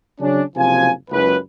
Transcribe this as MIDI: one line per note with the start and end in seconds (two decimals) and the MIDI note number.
0.20 0.42 49
0.20 0.42 54
0.20 0.42 61
0.20 0.42 62
0.56 0.91 30
0.56 0.91 48
0.56 0.91 53
0.56 0.91 77
0.56 0.91 80
1.11 1.36 30
1.11 1.36 37
1.11 1.36 71